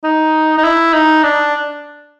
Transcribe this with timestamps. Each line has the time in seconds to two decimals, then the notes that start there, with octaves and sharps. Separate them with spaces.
0.04 D#4
0.58 D#4
0.64 E4
0.94 D#4
1.23 D4